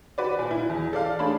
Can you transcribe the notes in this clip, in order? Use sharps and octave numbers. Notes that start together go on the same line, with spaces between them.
F#4 B4 D5
A#2
E4
E2
A4 D5 F5
A3 D4 G#4 C#5 A5 B5